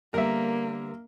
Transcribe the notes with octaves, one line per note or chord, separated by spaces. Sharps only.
D3 G3 A#3 B3 A#4 E5